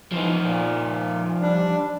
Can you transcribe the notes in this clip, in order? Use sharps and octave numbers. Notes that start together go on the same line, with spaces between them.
E3 F3 D#4
A#2
G3 D4